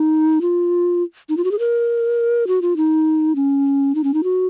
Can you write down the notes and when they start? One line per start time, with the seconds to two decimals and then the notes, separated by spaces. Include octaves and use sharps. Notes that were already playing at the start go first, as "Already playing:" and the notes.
Already playing: D#4
0.41 F4
1.29 D#4
1.37 F4
1.44 F#4
1.51 G#4
1.59 A#4
2.47 F#4
2.62 F4
2.77 D#4
3.36 C#4
3.95 D#4
4.04 C#4
4.14 D#4
4.24 F#4